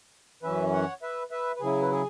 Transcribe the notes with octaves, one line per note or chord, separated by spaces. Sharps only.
F#2 E3 C#4 B4 E5
C#5 F#5
B4 E5
B4 E5
B4
C#3 F#3 E4 G#4
B4
G#4